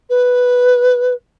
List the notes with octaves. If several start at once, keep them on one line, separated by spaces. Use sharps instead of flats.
B4